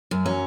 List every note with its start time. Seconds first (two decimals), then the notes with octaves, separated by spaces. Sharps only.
0.11 F#2
0.26 F#3 C#4